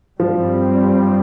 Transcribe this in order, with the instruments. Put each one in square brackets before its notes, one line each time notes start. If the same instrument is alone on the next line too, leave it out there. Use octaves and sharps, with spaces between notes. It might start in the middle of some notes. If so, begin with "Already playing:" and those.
[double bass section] G2 G3 C4 [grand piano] F3